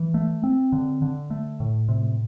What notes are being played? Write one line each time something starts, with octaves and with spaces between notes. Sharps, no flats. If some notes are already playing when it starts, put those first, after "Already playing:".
Already playing: E3
A3
C4
D3
D3
A3
A2
C3